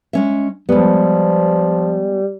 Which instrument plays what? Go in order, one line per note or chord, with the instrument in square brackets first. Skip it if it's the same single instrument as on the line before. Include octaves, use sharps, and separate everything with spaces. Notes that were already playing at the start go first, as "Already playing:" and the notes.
[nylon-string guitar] G#3 C#4 E5
[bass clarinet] F3 [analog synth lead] G3 [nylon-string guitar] G#3 B3